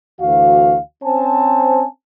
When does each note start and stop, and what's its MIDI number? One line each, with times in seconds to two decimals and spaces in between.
0.21 0.78 38
0.21 0.78 52
0.21 0.78 66
0.21 0.78 77
1.04 1.85 60
1.04 1.85 61
1.04 1.85 72
1.04 1.85 80
1.04 1.85 81